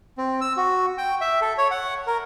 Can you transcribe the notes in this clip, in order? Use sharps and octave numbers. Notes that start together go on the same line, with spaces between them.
C4
E6
F#4
G5
E5
A4
C#5
F#5
A#4